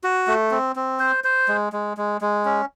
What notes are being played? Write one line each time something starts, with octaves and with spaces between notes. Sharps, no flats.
F#4
A3
C4
C4
C5
C5
G#3
G#3
G#3
G#3
C#4